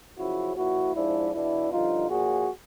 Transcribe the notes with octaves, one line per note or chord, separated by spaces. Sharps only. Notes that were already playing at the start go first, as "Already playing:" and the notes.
F#2 C#3 F3 E4 F#4
A#2 F3 E4 F#4
G#2 F3 D4 E4
E2 B2 D4 E4
G2 D3 F3 D#4 F4
A#2 F3 F#4 G#4